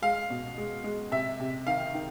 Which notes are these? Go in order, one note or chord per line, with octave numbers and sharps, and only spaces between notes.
G#3 F5
B2
G#3
G#3
C3 E5
C3
D#3 F5
D#3